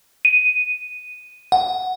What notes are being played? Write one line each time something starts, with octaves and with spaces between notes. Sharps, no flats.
D#7
F#5